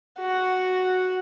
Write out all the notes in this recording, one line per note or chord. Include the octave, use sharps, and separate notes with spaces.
F#4